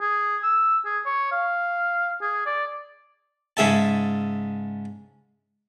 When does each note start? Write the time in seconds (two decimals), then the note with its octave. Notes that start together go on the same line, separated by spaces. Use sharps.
0.01 G#4
0.43 E6
0.85 G#4
1.06 C#5
1.32 F5
2.22 G#4
2.46 D5
3.57 G#2 C#3 E5 A5